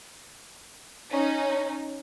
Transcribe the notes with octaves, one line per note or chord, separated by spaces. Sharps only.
C#4 D#4